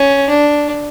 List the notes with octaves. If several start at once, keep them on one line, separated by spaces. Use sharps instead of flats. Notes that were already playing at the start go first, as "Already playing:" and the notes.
Already playing: C#4
D4